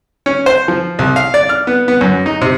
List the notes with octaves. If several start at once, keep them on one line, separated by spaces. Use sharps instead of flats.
C#4
C5
F3
C2
F5
D5
F6
B3
B3
F#2
D#4
C3